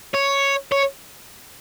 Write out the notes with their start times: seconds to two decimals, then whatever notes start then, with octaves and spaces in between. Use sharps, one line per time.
0.14 C#5
0.72 C#5